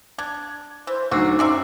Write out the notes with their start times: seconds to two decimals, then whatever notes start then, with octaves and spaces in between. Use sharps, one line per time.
0.18 D4 G#6
0.87 E3 C5
1.11 D2 F#3 D#4 F#4 D6 E6 C7
1.39 F#2 C3 D5 E5 G#5